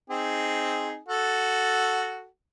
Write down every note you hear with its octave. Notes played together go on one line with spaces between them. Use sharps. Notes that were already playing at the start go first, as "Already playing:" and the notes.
C4 D#4 G#4
F#4 A4